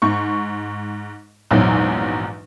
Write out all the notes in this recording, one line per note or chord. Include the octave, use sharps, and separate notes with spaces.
G#2 C#6
A#1 E2 G#2 F#3